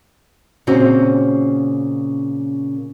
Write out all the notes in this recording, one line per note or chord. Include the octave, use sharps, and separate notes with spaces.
A#2 C#3 C4 C#4 F#4